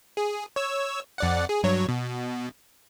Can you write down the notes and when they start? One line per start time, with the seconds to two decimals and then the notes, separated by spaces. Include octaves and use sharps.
0.17 G#4
0.56 C#5 E6
1.18 F2 D5 F#5
1.49 G#4
1.63 G2 F#3 C#5
1.89 B2